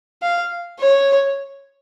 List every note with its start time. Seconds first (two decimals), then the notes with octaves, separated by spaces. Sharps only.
0.23 F5
0.81 C#5